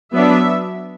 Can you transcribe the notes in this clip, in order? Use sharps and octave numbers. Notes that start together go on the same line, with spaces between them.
F#3 B3 D4 E5